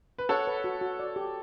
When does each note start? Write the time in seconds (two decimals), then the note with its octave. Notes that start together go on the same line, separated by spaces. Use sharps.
0.18 B4
0.29 A4 C#5 F#5
0.47 B4
0.64 F#4
0.81 F#4
0.99 D5
1.16 G4